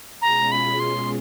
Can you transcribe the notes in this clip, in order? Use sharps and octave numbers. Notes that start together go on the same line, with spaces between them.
B2 G#3 C#4 F4 G#4 A#5
B5
C6